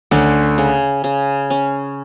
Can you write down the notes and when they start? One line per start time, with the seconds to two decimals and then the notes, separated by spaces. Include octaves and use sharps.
0.11 D2 D3 C#4
0.58 C#3
1.04 C#3
1.50 C#4